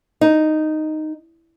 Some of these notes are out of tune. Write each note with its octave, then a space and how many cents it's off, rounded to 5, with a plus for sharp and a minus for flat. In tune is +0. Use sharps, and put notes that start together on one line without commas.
D#4 -5